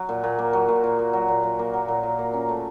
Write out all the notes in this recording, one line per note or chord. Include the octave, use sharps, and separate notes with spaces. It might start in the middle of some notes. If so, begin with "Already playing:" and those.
Already playing: F#3
A#2
A#2
A#3
F#3
A#2
A#2
A#3
F#3
A#2
A#2
A#3
F#3
A#2
A#2
A#3
C#4
A3